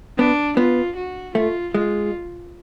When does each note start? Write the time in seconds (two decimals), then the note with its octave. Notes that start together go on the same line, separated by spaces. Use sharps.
0.18 B3 D4
0.57 B3 F4
0.96 F#4
1.35 A3 F4
1.74 G#3 F4